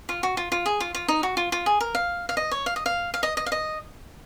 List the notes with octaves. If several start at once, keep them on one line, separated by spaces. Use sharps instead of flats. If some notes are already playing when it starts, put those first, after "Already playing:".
F4
F#4
F4
F4
G#4
F4
F4
D#4
F#4
F4
F4
G#4
A#4
F5
F5
D#5
C#5
F5
D#5
F5
F5
D#5
D#5
F5
D#5